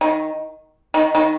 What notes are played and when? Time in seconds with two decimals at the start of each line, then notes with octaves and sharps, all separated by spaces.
0.01 D#3
0.94 D#3
1.15 D#3